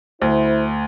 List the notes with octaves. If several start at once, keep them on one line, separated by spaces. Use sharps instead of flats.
D2 E4 C5